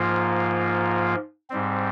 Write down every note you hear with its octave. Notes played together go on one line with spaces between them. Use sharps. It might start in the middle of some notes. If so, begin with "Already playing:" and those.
Already playing: G#2 F3 A#3 F4
G#2 G3 C4